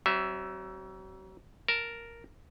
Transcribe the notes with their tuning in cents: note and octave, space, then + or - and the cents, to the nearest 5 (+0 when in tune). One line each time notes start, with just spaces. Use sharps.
F#3 +40 C4 +20 E5 +0
A#4 +0 A5 +0